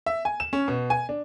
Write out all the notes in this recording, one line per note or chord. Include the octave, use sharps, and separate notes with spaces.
E5
G#5
E7
C#4
B2
G#5
D4